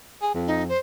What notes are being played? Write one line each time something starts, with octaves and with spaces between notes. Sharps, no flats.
G#4
F2
D#4
C5